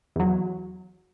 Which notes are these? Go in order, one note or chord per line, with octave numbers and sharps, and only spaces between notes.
E2 F#3